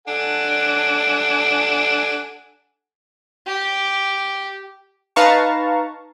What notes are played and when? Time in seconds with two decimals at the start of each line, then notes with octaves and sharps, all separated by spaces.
0.08 D4 A4 F#5 G#5
3.47 G4
5.16 D#4 B4 F5 A5 A#5 C#6